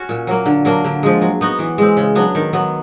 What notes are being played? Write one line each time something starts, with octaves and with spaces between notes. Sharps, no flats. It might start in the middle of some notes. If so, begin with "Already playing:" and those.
Already playing: C#4 F#4
A#2
F#3 A#3
D3
F#3 A#3 D4
D3
F3 G#3
F#3
B3 D#4 F#4
E3
G#3 C4
C#3
F#3 B3 D4
D#3
F#3 B3